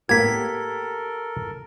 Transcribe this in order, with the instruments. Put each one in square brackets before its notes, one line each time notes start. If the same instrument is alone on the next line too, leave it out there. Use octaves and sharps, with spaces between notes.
[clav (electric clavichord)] A2 A#3 B3 [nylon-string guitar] G4 [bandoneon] A4 A#4 [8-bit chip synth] G#6 B6